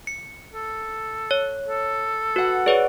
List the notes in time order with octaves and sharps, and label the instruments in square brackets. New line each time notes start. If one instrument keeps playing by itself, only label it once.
[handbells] C#7
[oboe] A4
[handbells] C#5
[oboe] A4
[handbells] F#4 [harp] B4 F#5
[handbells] G#4 B4 C#5 [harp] D5